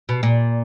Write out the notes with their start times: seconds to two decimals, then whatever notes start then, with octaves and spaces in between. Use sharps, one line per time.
0.09 B2
0.23 A#2